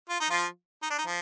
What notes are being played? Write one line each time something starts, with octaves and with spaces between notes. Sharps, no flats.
F4
D#4
F3 F4
D#4
D4
D#4
F3